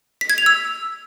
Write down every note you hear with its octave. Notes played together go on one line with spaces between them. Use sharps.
B6
G#6
F7
E6